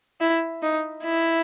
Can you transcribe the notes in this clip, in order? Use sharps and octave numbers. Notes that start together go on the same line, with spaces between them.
E4
D#4
E4